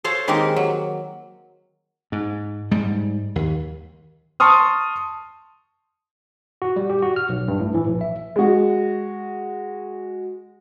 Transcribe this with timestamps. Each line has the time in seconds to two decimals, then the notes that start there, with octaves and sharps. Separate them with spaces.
0.04 A4 C5 C#5 F5
0.28 D#3 G#3 A#3 C4 G4 A#4
0.56 F#3
2.12 G#2
2.71 G#2 G3
3.36 D#2
4.40 A5 C6 C#6 D#6 F6
6.62 F#4
6.76 G3
6.90 G4
7.02 F#4
7.16 F6
7.29 B1
7.48 G2
7.60 A2
7.75 E3
7.86 A#1
8.01 E5
8.36 G#3 F#4